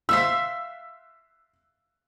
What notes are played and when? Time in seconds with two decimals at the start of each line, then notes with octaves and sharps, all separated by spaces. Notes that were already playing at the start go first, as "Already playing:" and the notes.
0.09 E5 F5 C6 E6 B6